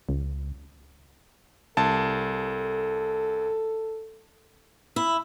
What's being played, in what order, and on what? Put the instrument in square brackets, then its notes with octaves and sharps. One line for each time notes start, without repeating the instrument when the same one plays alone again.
[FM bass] C#2
[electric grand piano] C2 A5 [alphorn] A4
[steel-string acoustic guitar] E4